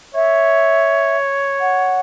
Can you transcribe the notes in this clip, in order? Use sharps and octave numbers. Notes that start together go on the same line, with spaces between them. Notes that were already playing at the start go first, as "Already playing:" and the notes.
C#5 E5
F#5